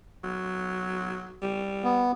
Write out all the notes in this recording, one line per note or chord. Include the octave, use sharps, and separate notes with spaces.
F#3
G3
B3